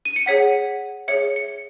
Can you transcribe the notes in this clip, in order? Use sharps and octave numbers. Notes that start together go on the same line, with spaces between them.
D#7
C#7
G#4 C#5 F#5 B6
G#4 C#5 E5 C#7
C#7